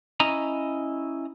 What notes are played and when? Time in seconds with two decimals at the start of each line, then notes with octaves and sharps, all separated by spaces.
0.20 C#4 E4 D#5 A#5